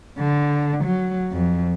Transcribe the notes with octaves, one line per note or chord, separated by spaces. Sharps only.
D3
F#3
F2